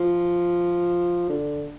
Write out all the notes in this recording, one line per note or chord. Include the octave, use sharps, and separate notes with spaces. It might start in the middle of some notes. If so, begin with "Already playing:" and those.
Already playing: F3
D3